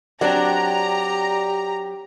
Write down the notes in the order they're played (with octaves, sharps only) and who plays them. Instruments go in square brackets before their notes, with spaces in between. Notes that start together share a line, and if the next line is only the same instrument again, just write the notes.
[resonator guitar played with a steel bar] F#3 C4 D4 [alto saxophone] G4 [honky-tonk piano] D5 [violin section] A#5